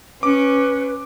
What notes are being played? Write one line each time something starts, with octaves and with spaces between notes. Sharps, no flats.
C#4 B4 D6